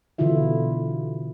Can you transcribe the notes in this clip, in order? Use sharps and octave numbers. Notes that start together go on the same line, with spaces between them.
B2 D3 E3 E4 F4 E5